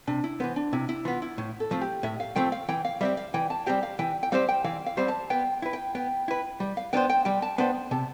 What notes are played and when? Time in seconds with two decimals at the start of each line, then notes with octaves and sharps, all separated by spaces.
0.07 C3 D4
0.24 E4
0.40 E3 B3 C5
0.56 D4
0.73 C3 E4
0.89 E4
1.05 E3 B3 F4
1.22 E4
1.38 A2
1.60 A4
1.71 F3 A3 C4
1.81 G4
2.03 A2 E5
2.20 F5
2.36 F3 A3 C4 G5
2.52 F5
2.69 E3 G5
2.85 F5
3.01 G3 C4 G4 E5
3.17 F5
3.34 E3 G5
3.50 A5
3.66 G3 C4 G4 G5
3.83 F5
3.99 E3 G5
4.23 G5
4.32 G3 C4 G4 C5 F5
4.48 G5
4.64 E3 F5
4.86 F5
4.97 G3 C4 G4 C5
5.08 A5
5.30 B3 G5
5.62 E4 B4
5.73 G5
5.95 B3 G5
6.28 E4 B4
6.60 G3
6.77 F5
6.93 B3 D4 A4 C5 G5
7.10 G5
7.25 G3 G5
7.42 A5
7.58 B3 D4 A4 C5 G5
7.91 C3 A5